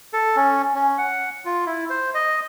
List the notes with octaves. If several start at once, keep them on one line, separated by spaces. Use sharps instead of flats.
A4
C#4
C#4
F#5
F4
E4
C5
D#5